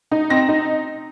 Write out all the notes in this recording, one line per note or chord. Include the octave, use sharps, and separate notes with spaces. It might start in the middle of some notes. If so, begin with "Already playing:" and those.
D#4
C4 A#6
D#4